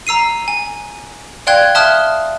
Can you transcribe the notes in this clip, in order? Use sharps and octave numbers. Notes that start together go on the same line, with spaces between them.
A#5 E6 C7 D#7
G#5
D5 F5 G5 C6 F#6 G#6
E5 A5 C6 D#6 F6 F#6